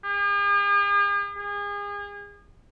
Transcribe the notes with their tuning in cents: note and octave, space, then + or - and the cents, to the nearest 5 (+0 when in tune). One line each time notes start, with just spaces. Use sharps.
G#4 -45
G#4 -35